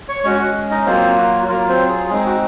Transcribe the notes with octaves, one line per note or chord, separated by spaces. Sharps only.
C#5 C#6
G#3 C#4 F#4 C#5 C#6
F#4 F#5
D#4 D#5
F#3 A#3 C4 F4 C5
F#4
F#3 A#3 F4 A#4
C4 C5
G#4
G#3 C4 D#4 G#4
F#4